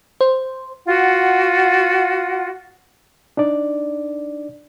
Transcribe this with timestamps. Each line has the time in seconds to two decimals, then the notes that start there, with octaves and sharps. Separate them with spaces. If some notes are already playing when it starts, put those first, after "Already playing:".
0.21 C5
0.86 F4 F#4 F#5
3.37 D4 D#4 D5